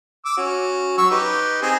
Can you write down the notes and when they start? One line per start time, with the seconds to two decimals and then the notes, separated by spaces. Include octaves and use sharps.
0.25 D6 E6
0.37 C#4 F#4
0.98 F#3 C#6 E6
1.11 D#4 G4 B4
1.62 C4 D#4 G#4